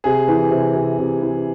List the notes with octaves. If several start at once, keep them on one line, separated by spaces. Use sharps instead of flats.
C3 G#4
E3
C3
C3
C3
E3